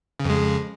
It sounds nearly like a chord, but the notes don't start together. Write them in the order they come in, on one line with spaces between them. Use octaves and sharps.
C#3 F2 G#3